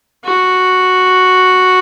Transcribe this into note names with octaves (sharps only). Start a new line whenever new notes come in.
F#4